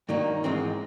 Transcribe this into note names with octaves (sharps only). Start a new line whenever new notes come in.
G2 D#3 F#3 A#3 D#4
G#2 E3 G#3 C4 D#4